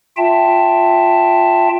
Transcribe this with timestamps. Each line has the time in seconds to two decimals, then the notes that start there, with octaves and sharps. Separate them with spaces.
0.17 F4 E5 G5 A5